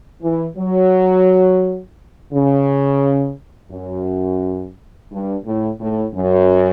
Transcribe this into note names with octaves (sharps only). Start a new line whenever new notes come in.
E3
F#3
C#3
F#2
G2
A2
A2
F#2